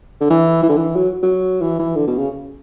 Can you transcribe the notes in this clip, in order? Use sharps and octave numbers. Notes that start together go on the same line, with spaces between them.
D3
E3
E3
D3
E3
F#3
F#3
E3
E3
D3
B2
C#3